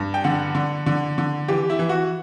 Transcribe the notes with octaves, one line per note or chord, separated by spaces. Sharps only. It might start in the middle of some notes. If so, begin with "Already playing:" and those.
Already playing: G2
G5
D3 F#5
D3
D3
D3
E3 G4
E4
E3
F#4